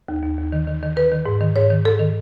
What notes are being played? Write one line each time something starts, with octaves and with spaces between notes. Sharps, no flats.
D#2
D#2
D#2
D#3
D#3
D#3
D#3 B4
D#3
G#2
D#3
G#2 C#5
D#3
G#2 A4
D#3